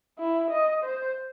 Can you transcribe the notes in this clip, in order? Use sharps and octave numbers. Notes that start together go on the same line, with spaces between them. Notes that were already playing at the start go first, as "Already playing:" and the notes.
E4
D#5
C5